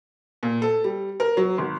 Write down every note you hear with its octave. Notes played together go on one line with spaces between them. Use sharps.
A#2
A4
G3
A#4
F#3
G#1